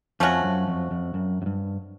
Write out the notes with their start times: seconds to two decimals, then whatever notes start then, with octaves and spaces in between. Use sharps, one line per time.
0.20 F2 F3 A3 C#4 F#4
0.44 F#2
0.68 F2
0.91 F2
1.14 F#2
1.42 F#2
1.46 G2